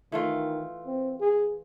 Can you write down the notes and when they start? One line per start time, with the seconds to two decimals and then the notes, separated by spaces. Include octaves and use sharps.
0.12 D#3 E3 A3 F4
0.86 C4
1.20 G#4